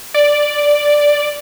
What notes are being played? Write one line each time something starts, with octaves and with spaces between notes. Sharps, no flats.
D5